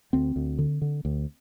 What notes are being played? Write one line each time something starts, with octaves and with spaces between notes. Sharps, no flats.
D2 C4
D2
D3
D3
D2